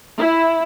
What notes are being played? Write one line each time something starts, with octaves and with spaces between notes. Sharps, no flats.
E4